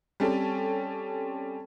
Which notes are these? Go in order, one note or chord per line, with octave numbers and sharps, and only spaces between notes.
G3 C4 C#4 A4